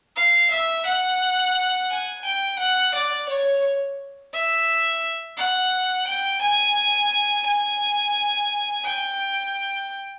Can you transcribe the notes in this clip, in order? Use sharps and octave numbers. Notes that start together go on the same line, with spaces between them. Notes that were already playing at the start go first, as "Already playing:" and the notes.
F5
E5
F#5
G#5
G5
F#5
D5
C#5
E5
F#5
G5
G#5
G#5
G5